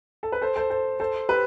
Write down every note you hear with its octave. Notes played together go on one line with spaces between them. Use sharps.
A4
B4
A4 C5
A4 C5
A4 C5
A4 C5
G4 B4